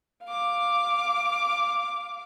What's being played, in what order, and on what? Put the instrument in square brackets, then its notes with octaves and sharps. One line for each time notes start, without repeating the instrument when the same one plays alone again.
[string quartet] F5 D6